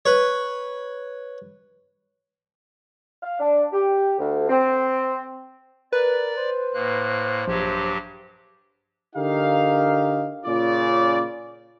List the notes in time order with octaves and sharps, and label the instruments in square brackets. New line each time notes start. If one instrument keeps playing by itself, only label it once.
[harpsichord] B4 C#5
[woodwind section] F5
D4
G4
D2
C4
[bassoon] A#4 [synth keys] B4 [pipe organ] D5
[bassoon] C5
[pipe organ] A2 A#3 F#6
[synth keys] A#1 [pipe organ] G2 F#3 G4
[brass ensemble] D3 D#4 G4 A#4 F5
A#2 C#3 C#4 F4 D5